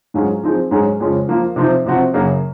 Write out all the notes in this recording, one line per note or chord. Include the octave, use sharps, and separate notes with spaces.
G#2 F#3 C#4 F4 G#4
F3 C4 D#4 G#4
G#2 F#3 C#4 G#4
F2 C#3 F3 G#3 C#4
F3 A#3 F4
C3 F3 C4 D#4
C3 F3 C4 F#4
F#2 C#3 F#3 A#3